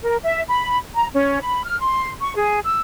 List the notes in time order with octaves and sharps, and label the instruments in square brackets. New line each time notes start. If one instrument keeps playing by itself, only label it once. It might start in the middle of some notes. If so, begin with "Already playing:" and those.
[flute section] A#4
E5
B5
A#5
C#4
B5
F6
C6
C#6
G#4
E6